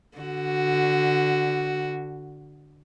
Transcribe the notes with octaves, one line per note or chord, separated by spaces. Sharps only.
D3 F#4